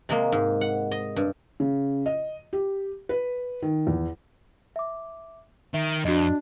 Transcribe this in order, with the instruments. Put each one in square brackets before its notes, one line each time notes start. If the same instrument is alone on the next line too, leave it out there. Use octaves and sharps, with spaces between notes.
[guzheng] C3 G#3 A#3
G#2
F#5
D#5
G2
[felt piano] C#3
D#5
G4
B4
D#3
E2
[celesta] E5 D6
[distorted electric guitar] D#3 [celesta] E5
[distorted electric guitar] F2 [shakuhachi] D4 [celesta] F#4 D#5